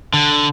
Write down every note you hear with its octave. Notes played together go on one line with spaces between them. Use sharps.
D3